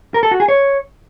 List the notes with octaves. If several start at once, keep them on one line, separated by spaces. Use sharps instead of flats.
A#4
A4
F#4
G#4
C#5